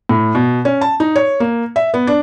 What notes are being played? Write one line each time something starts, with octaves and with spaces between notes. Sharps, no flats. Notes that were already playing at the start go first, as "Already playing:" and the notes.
A2
B2
C#4
A5
D#4
C#5
A#3
E5
B3
D4